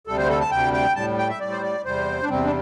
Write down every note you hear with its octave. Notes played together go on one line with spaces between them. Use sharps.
D2 C3 G3 A4
C5
A4
A5
D2 C3 G3 G5
G5
A2 G3 A5
G5
E5
A2 G3 D5
C5
D5
E2 C3 G3 C5
D4
E2 C3 G3 C4
D4